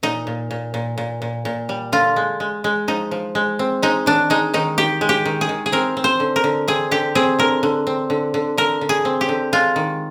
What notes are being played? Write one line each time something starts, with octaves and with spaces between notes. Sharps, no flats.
A#2 D#4
A#2
A#2
A#2
A#2
A#2
A#2
G3
D3 F4
G#3
G#3
G#3
F3 D#4
F3
G#3
C4
G#3 D#4
D#3 D4
G#3 D#4
D#3 D#4
D#3 G4
G#3
G4
D#3
G#4
D#3
G#4
C4 A#4
C4
C5
D3
A#4
D3
C4 G#4
D3 G4
C4 G#4
D3 A#4
D3
C4
D3
D3
D3 A#4
D3
G#4
C4
G4
D3
G#3 F4
D#3